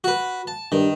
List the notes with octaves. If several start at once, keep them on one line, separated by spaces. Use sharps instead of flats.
F#4 B4
A5
G2 D#3